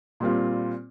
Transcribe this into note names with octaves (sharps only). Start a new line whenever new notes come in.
A#2 G3 C4 F4